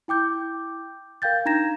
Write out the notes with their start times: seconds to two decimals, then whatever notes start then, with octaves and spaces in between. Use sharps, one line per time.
0.08 E4 G5 D6 G6
1.22 A#4 F5 G5 G6 A6
1.45 D4 D#4 A#5 G#6 A#6 E7